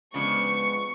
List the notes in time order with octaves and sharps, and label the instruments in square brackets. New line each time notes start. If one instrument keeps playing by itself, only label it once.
[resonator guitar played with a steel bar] C#3 F3 D4 [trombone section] G#3 B3 [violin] C#6